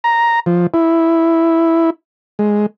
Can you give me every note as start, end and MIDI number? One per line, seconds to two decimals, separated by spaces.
0.04 0.40 82
0.46 0.67 53
0.74 1.90 64
2.39 2.66 56